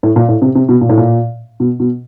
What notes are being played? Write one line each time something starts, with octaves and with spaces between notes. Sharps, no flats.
A2
A#2
A2
C3
C3
B2
A#2
A2
A#2
B2
B2